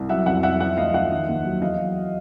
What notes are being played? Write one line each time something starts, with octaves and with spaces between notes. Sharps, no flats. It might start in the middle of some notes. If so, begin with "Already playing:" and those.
Already playing: C2
F#3 E5 F#5
F2 E5 F#5
F2 E5 F#5
F3 E5 F#5
D2 D#5 F5
F3 E5 F#5
D#3
D#2
F#3
E2 D#5 F5
F#3